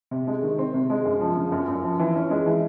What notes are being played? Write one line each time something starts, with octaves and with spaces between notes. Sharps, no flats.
C3
G#3
D#3
C4
C3
G#3
F#2
F3
C#3
F#2
F#2
F3
E3
C#4
G#3
E3